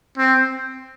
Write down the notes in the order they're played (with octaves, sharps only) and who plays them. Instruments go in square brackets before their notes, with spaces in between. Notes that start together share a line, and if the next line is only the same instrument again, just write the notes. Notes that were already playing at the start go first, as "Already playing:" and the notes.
[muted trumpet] C4